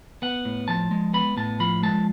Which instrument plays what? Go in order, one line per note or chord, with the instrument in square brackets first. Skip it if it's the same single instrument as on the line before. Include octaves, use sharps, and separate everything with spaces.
[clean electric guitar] B3 F#5
A2
F3 A5
G#3
B3 B5
A2 A5
F3 B5
G#3 A5